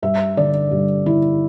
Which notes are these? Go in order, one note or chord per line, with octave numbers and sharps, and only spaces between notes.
G2 E5
D3 D5
G2
D3 E4